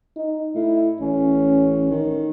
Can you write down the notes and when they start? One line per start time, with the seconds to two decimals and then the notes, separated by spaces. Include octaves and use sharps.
0.16 D#4
0.55 A2 E4
1.01 A1 C#4
1.91 D#3